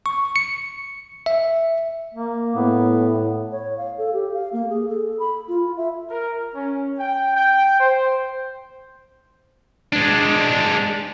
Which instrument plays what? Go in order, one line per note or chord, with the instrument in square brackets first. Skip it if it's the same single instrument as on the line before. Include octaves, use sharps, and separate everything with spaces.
[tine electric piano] C#6
C#7
E5
[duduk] A#3
[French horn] A2 [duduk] B3
[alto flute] C#5
F5
A4
G4
F5
A#3
G#4
A4
B5
F4
E5
[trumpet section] A#4
C#4
G5
G5
C5
[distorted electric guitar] G#3 D4